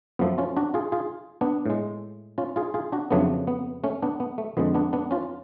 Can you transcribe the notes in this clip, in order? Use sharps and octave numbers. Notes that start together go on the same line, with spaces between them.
F#2 F3 A3 B3
C#4 F4
D4 F#4
F4 G#4
F4 G#4
B3 D4
A2 G#3
C#4 F4
F4 G#4
F4 G#4
D4 F#4
F2 C#3 F#3 A3 B3 D4
B3
A3 C#4
B3 D4
B3
A3
F2 D3 G#3 B3
B3 D4
B3 D4
C#4 F4